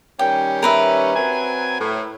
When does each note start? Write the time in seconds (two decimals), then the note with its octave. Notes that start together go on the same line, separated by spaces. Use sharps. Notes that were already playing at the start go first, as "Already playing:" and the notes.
0.19 D#3 G3 C#4 G5
0.63 A#4 B4 E5
1.15 F#3 C4 G#5
1.79 A2